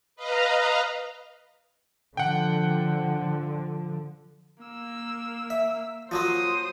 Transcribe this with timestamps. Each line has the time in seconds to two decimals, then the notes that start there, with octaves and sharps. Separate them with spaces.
0.16 B4 D#5 F5 A#5
2.17 D3 F3 F#5 G5
4.64 A#3 E6
5.50 E5
6.11 F3 F#3 A#3 C5 D#6